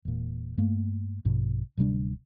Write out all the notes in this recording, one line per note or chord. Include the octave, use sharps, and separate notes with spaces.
E1 A#2
G2 A3 A#3
A#1 G2 B2
D1 C3 G3 D4